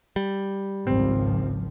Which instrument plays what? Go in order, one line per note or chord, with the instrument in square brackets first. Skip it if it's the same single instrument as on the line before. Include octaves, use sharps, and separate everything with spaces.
[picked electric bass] G3
[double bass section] G#1 C#2 F3 [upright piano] C4